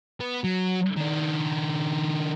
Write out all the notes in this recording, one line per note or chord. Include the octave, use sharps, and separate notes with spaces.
B3
F#3
D#3 D4